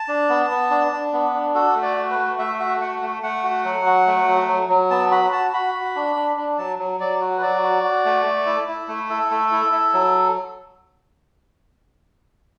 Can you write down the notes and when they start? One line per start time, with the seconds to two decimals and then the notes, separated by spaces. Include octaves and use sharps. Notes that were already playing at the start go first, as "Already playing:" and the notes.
Already playing: A5
0.08 D4
0.29 B3
0.50 B3
0.70 D4
0.92 D4
1.13 B3
1.34 D4
1.55 F#4 A4
1.76 A3
1.82 D5
1.97 F#4
2.10 B4
2.18 A3
2.39 A3 E5
2.59 F#4 E5
2.80 A3 F#5
3.01 A3
3.23 A3 F#5
3.44 F#4
3.64 F#3
3.86 F#4
4.07 A3
4.28 F#3
4.48 F#3
4.69 F#3
4.90 B3 A5
5.11 F#4 B5
5.32 F#4 A5
5.53 F#4 B5
5.74 F#4
5.96 D4
6.16 D4
6.37 D4
6.58 F#3 A5
6.79 F#3
7.00 F#3 D5
7.21 F#4
7.37 B4
7.42 F#3 D5
7.63 F#4
7.84 F#4
8.05 A3
8.26 A3
8.46 E4
8.68 E4
8.88 A3
9.09 E4 A4
9.31 A3
9.52 E4
9.72 E4
9.94 F#3